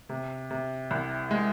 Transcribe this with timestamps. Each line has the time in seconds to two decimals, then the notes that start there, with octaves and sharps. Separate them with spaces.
0.09 C3
0.51 C3
0.91 C2
1.31 G#3